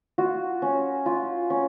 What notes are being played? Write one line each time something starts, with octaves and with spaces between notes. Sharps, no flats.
F4 F#4
C#4
F4
C#4